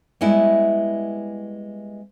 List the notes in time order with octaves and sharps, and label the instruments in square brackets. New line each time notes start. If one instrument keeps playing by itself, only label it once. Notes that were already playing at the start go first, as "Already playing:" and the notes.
[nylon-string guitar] G3 G#3 B3 E4